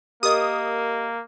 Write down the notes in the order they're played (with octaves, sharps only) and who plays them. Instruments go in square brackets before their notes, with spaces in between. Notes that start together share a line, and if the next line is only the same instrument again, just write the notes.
[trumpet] A#3 [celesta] G4 A#4 D#5 [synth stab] D#6